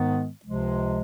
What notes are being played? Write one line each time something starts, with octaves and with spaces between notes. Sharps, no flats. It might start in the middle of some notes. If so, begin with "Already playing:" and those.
Already playing: G#2 D#3 G#3 B3
C#2 C3 F3 G#3